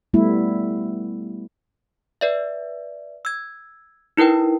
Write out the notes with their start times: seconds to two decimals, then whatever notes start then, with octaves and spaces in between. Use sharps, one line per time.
0.14 G3 A3 B3 E4
2.21 B4 D5 E5
3.25 E6 G#6
4.17 D#4 E4 A#4 B4 G5